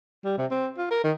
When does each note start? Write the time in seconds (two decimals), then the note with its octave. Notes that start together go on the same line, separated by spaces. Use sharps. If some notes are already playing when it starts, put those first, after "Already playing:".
0.24 G3
0.38 C3
0.51 C4
0.78 F4
0.90 A#4
1.04 D#3